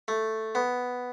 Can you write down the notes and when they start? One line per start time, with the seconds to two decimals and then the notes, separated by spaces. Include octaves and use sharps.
0.08 A3
0.55 B3